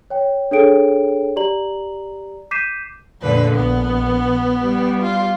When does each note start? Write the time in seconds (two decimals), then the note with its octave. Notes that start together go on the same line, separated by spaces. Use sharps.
0.10 C#5 G5
0.51 D4 G#4 A4 C#5 G5 D7
1.36 G4 D5 A#5 F#7
2.51 D6 G6 B6 C7 D#7 E7
3.22 F2 A#2 D3 B4
3.55 A#1 B3
4.62 G3
5.03 F4